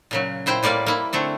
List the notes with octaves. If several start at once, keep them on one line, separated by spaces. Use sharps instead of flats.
A#2 C#3 F#3
A#2 E4 C5 G5
A2 G3 A#3 D5 F5
A#3 E4
D3 A3 C4